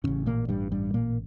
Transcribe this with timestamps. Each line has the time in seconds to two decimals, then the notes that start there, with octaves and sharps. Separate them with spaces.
0.04 A1 A2 C#3 C#4
0.26 A#2 A#3
0.49 G2 G3
0.72 G2 G3
0.94 A#2 A#3